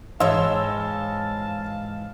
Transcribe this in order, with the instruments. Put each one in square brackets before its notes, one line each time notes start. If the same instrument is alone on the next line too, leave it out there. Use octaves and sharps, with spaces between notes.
[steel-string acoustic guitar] G#2 E3 [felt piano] C#5 D#5 [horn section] F5 A5 [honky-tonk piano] C6 E6